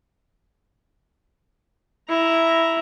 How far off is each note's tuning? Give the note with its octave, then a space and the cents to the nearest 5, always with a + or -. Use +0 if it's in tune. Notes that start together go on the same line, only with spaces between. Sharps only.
E4 +0 A#5 +0